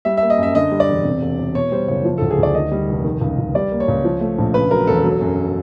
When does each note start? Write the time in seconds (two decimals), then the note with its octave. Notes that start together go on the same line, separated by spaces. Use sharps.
0.05 G3 E5
0.17 A#3 E5
0.30 D#5
0.38 F#2 E5
0.55 D3 D#5
0.71 G3
0.80 D5
0.89 E1
1.05 C3
1.22 E1
1.39 E1
1.55 B2 C#5
1.72 G3 C5
1.88 F#1 C#5
2.05 F3
2.18 D2 A4
2.30 G#4
2.38 D2 D5
2.55 D#3 D#5
2.72 G3
2.88 F1
3.04 D#3
3.21 C#2
3.38 C#2
3.55 G3 D5
3.72 A#3
3.80 C#5
3.88 C#2
4.04 F3
4.21 A3
4.38 A#1
4.54 C#3 B4
4.71 F#3 A#4
4.87 E1 A4
5.04 F#3
5.21 F#2